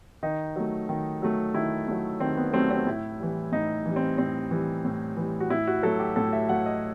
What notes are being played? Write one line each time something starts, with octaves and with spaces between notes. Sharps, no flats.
D#3 D#4
F#3 A3
D#3
F#3 A3
D#3 E4
F#3 A3
D#3 C4
B3
F#3 A3 C4
C4
A2 E4
E3 G3
A2 D#4
E3 G3
C4
A2 C4
E3 G3
A2
E3 G3
F#4
A2 E4
F#4
F#3 A3 A4
G4
A2 A4
E5
F#3 A3 F#5
D#5